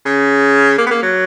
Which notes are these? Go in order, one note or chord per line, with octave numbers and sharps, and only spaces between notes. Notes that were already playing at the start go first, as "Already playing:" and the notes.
C#3
A#3
B3
A#3
F#3